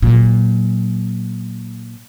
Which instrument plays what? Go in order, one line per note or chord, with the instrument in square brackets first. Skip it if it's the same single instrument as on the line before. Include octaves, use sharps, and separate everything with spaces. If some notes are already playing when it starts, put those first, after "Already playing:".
[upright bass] A#2 F#3